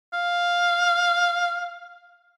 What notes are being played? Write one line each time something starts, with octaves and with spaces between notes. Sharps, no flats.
F5